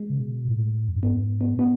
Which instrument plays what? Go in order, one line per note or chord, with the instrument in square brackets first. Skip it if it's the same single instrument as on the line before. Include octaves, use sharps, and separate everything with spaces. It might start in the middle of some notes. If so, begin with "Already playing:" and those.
Already playing: [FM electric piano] G#3
[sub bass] C#3
B2
A2
F2
F#2
[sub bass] G#2 [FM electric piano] B3
[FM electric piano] B3
[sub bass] A2
[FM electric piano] B3